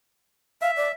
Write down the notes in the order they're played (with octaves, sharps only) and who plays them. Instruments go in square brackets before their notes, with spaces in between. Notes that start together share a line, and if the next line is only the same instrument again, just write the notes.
[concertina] E5 [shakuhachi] F5
[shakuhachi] D5